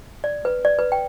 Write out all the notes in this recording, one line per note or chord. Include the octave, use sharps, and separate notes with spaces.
D5
B4
D5
B4
G5